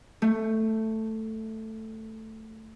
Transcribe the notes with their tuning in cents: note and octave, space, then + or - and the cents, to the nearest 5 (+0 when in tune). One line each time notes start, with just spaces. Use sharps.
A3 +5